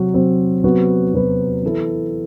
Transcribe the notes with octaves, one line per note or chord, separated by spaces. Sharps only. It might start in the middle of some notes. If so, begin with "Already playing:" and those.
Already playing: C3 F#3 C4 F#4
C3 F#3 C4 F#4
C3 F#3 B3 F#4 B4
C3 F#3 B3 F#4 B4
E3 B3 E4 A4